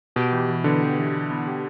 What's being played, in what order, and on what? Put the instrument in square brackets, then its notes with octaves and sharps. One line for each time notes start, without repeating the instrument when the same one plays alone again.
[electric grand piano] B2 [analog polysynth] G4
[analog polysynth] E3
E3
[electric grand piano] D3 [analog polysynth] B3
[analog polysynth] G4
E3
E3
B3
G4